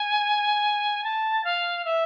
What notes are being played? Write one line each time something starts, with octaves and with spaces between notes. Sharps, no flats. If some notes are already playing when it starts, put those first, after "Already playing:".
Already playing: G#5
A5
F5
E5